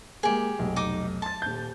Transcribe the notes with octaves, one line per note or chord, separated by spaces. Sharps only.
G#3 A#3 G4 G#4
F1 B1
D#4 D6
A5 C6 A6
D#1 G6